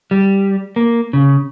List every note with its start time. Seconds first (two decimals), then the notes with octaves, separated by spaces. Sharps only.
0.11 G3
0.76 A#3
1.13 C#3